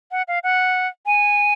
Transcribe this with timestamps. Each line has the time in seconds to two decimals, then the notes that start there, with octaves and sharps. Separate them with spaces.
0.11 F#5
0.28 F5
0.44 F#5
1.06 G#5